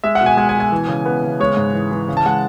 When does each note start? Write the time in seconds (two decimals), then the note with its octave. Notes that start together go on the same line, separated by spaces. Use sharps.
0.04 G#3 E5
0.15 F#5
0.21 B2
0.26 G#5
0.37 G#3 G#5
0.49 G#5
0.55 B2
0.60 G#5
0.72 E3
0.89 C#3
1.05 B3
1.23 C#3
1.40 G#3 C#5
1.57 G#2
1.74 E3
1.91 E3
2.08 C#3
2.17 A5
2.25 G#3 F#5